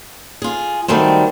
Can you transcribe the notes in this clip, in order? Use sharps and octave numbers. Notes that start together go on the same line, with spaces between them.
F4 G#4
D#3 F#3 G3 A3 C4